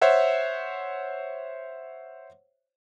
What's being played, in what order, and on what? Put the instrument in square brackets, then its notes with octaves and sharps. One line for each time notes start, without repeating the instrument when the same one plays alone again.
[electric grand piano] C5 C#5 E5 F#5